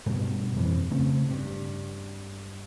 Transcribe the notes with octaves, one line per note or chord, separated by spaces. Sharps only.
G2 B2
F2 E3
C#3 A3 C4
G2